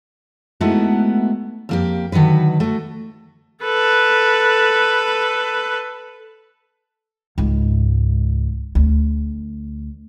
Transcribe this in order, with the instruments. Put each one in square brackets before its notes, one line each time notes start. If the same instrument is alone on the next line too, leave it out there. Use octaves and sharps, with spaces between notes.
[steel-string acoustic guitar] G#3 A3 B3 D#4 E4 F#4
F2 A#3 G4
D3 D#3 F#3 F#4 B4
A3 F#4
[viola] A4 B4
[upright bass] C#2 G#2
D2